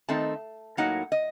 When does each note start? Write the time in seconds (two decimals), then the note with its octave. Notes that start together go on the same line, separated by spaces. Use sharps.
0.09 D#3 A3 C4 D#4 A5
0.77 A2 F#3 A#3 D#4 F#5
1.12 D#5